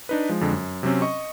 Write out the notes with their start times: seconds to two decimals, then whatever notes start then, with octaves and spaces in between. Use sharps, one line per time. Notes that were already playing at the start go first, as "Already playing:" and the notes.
0.09 D4 D#4 B4
0.29 F3 G#3
0.41 F2 D3 G#3
0.53 F#2
0.83 C3 F#3 C4 C#4
1.02 D#5 C#6